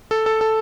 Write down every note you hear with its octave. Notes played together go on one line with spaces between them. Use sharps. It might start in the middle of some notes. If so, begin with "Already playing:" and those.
A4
A4
A4